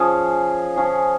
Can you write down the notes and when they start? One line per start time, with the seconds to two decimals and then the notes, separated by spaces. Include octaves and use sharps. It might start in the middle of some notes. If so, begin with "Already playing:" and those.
Already playing: F3 C#4 G#4
0.76 F3 C#4 G#4